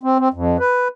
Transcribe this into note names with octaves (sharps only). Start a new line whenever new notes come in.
C4
C4
F2
B4